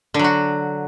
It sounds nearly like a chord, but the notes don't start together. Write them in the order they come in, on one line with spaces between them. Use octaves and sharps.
D3 F#3 F#4